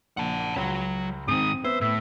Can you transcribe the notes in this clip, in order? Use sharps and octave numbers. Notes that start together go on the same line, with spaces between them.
A#1 F#5 A5
C#2 F#3 C#5
G#2 D#3 C4 D#6
B3 C5 E5
A2 E5